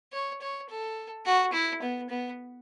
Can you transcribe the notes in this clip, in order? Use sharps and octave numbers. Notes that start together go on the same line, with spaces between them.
C#5
C#5
A4
F#4
E4
B3
B3